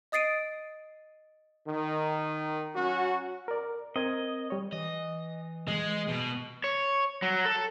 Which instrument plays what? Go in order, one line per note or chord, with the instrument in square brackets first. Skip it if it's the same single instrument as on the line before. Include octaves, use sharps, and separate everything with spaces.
[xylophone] D#5 D#6 A6 C7 D7 D#7
[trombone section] D#3
F#3 C#4 F#4
[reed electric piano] A#4 D5
[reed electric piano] C4 A#4 G#6 [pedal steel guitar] D#5
[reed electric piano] G3 C#5
[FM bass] E3 [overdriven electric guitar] D#5
[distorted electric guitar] G#3 [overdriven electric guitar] D#5
[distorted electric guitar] B2
[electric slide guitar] C#5
F#3
A4